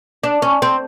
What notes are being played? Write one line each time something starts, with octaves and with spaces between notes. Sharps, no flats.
D4
C#4
C4